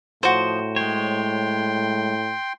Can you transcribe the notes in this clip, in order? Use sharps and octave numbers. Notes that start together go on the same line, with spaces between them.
A2 F3 F#4 C5
G#3 C#5 G5 C6